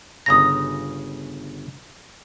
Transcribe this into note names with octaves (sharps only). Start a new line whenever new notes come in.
G1 C#3 A#5 D#6 A#6